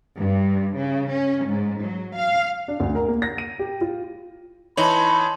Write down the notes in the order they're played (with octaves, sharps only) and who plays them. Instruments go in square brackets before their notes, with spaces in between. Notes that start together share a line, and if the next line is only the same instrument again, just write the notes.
[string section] G2
C#3
C#4
G#2
F#3
F5
[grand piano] D4
D2
A#4
A#3
A#6
D#7
G4
F4
[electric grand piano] E3 D#4 C#5 [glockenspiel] A5 C6 F#7 [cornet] B5